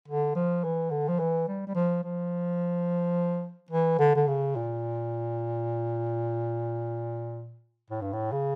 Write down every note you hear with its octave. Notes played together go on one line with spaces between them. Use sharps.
D3
F3
E3
D3
F3
E3
G3
G3
F3
F3
E3
D3
D3
C#3
A#2
A2
G2
A2
C#3